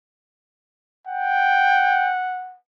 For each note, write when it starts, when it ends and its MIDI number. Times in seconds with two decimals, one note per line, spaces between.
1.07 2.56 78
1.07 2.13 79